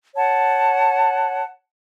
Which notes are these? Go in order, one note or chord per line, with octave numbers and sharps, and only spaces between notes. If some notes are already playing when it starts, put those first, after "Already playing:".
C#5 F#5 A5